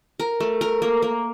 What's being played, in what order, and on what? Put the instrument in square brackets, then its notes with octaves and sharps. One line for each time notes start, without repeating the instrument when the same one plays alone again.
[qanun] A#4
A3
A#4
A#3
A#3